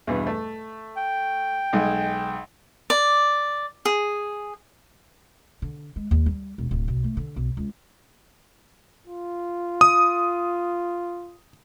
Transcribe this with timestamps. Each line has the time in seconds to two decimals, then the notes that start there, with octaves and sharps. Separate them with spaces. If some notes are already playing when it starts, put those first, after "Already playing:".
0.07 E2 G2 B2
0.27 A3
0.97 G5
1.73 B1 G#3
2.90 D5
3.85 G#4
5.62 D3
5.96 G#3
6.11 D#2
6.26 G3
6.58 E1
6.71 D1
6.88 B1
7.04 A3
7.17 D3
7.36 B1
7.57 C#2
9.07 F4
9.81 D#6